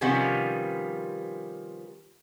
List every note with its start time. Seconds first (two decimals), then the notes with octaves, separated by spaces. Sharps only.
0.01 C3 D#3 F3 G3 B3 C#4